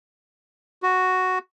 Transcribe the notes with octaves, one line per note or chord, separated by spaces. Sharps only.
F#4